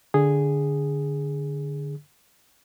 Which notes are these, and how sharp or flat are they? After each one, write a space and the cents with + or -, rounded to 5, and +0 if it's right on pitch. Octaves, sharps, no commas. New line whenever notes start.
D3 +0 G#4 -5